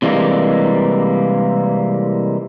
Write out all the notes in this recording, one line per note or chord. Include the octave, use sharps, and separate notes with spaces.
C3 E3 G3 G#3 A#3